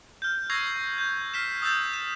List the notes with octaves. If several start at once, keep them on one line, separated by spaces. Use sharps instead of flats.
F6 G6
C#6 E6 G#6 A#6 C7 F7
G6
F6 B6 C7 E7
D#6 E6 G6 A6 E7
E7